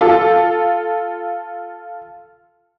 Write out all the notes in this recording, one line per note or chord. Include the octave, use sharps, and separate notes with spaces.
F4 A4